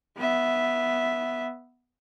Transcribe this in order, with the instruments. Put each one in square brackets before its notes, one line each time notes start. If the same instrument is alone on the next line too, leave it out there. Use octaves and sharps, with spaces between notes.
[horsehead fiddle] B3 E5